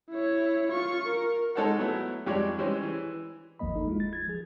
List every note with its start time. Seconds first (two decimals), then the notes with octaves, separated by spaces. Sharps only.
0.11 E4 C#5
0.71 F4 C#6
1.07 A#4
1.55 G#3 D#4 A4 C5 C#5 F#5
1.79 F#3 A3 B3 E4
2.26 F2 G3 G#3 C#5 D5
2.58 E3 G3 G#3 C#4 C5 C#5
2.83 E3
3.59 G1 D#2 F3 A#3 D#5 B5
3.76 D#4 A4
3.87 G#3 E4 F4
4.00 A6
4.13 G#6 A6
4.27 F3 G#4